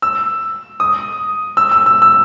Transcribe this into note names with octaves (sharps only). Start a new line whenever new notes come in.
E6
D#6
E6
E6
E6
E6